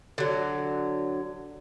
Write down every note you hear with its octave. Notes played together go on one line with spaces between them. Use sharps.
D3 F#3